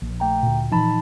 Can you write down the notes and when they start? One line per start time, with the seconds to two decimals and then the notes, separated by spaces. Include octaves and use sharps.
0.02 A#1
0.20 A3 G5 A#5
0.43 D2 A#2
0.72 A#2 E3 F3 D#4 A5 B5